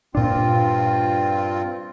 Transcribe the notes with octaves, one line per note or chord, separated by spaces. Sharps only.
G2 A#2 C4 D4 F4